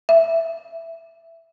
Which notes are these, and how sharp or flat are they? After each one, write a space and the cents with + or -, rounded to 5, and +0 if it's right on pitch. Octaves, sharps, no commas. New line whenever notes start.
E5 +10